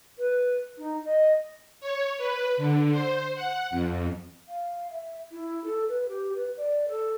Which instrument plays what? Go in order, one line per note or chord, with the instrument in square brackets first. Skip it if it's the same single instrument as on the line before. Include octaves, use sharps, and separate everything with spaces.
[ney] B4
D#4
D#5
[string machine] C#5
B4
D3
C5
F#5
F2
[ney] F5
E5
E4
A4
B4
G4
B4
D5
A4